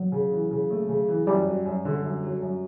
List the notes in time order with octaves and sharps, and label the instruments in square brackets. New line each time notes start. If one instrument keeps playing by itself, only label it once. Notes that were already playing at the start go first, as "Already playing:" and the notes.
Already playing: [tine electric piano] F#3
[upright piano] C#3
E3
C#3
A3
C#3
E3
[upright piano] F#2 [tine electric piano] G3
[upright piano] F#3
F#2
D3
F#2
F#3
F#2